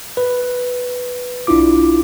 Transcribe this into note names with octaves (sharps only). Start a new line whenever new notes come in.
B4
B1 D4 E4 F4 D6